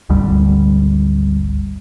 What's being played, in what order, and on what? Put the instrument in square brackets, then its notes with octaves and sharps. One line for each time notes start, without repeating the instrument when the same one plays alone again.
[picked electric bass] G#1 D2 D3 G3